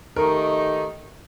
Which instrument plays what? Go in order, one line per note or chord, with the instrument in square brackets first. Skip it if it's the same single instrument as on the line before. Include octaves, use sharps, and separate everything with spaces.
[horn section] D#3 A3 D#4 G4 [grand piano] A#4